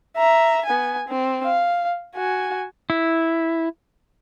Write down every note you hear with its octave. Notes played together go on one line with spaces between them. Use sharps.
E5 A#5
B3 G#5
C4
F5
F#4 G#5
E4